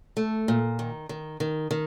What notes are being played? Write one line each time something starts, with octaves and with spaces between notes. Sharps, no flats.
A3
A#2
D#3
D#3
D#3
D#3